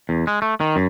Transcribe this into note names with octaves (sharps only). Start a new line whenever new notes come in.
E2
G#3
A3
D#3
F#2